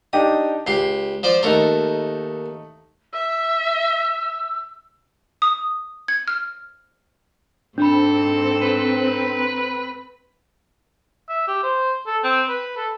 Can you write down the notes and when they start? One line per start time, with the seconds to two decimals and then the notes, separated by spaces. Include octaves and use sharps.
0.13 D4 D#4 G4 D#6
0.67 C#2 G4 C7
1.23 F3 C5 D5
1.43 D#2 A3 D#4 A4 A#4
3.13 E5 E6
5.42 D#6
6.08 G#6
6.28 F6
7.78 G#2 C4 D4 A4 B5
8.62 B4
11.29 E5
11.48 G4
11.63 C5
12.07 A4
12.24 C4
12.49 B4
12.77 A4